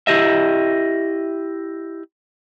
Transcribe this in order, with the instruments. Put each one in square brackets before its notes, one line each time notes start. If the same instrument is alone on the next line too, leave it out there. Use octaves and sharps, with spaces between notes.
[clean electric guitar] E4 G4 D#5 E5